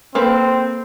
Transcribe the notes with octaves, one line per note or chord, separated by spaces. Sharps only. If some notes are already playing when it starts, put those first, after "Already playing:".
A#3 C4 A4 B4